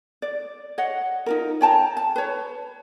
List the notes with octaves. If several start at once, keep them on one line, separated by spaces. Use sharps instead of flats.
D5
C#5 D#5 F#5
D#4 F4 A#4
C#5 G5 A5 A#5
A5
B4 C#5